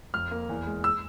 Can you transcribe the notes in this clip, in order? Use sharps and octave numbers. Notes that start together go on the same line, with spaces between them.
F2 F6
A#3
E2
G#3
E6